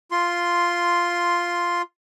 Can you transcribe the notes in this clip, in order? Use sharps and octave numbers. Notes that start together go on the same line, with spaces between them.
F4 C6